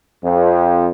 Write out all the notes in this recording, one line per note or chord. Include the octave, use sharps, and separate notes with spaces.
F2